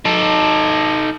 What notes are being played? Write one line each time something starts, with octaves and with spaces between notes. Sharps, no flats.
D#4 A4